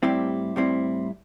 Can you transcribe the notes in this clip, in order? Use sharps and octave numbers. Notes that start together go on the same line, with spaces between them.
A2 G3 C4 E4 G4
A2 G3 C4 E4